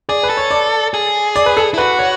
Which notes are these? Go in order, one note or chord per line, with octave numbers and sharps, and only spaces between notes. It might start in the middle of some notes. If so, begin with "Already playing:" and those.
G#4 D5
B4
A4
C#5
D5
G#4
D5
B4
A4
E4
F#4 B4
C#5